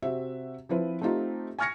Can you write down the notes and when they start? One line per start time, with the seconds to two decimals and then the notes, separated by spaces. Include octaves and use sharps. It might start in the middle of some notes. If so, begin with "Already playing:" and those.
0.02 C3 C4 F#4 E5
0.69 F3 C4 E4 F4 B4
1.01 A3 C4 D#4 F4 G4
1.59 G#5 C#6 F6 G#6 A#6 C#7